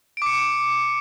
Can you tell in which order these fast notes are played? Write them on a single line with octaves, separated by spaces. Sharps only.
D7 D6 C#7